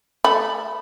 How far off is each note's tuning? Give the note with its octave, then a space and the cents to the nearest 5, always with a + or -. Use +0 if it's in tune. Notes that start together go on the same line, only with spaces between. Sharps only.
A3 +0 B5 +0